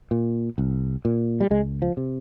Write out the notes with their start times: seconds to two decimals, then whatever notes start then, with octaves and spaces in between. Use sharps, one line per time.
0.11 A#2
0.58 C2
1.05 A#2
1.40 G3
1.50 C#2 G#3
1.82 F3
1.97 C3